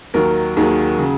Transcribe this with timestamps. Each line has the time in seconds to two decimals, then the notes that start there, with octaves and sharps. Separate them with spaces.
0.14 D#2 D#3 F#3 A#3 A#4
0.57 D#2 D#3 F#3 A#3 G#4
0.99 C#3 F#3